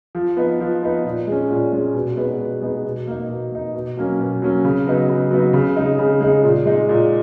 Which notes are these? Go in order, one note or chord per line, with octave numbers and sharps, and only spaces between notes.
F3
B3 D#4
F3
B3 D#4
A#2
G#3 C#4
A#2
G#3 C#4
B2
G#3 B3 D#4
B2
G#3 B3 D#4
B2
A#3 D#4
B2
A#3 D#4
B2
F#3 A#3 C#4
B2
F#3 A#3 C#4
C#3
F#3 B3 D#4
C#3
F#3 B3 D#4
C#3
G#3 D#4
C#3
G#3 D#4
A#2
G#3 D#4
A#2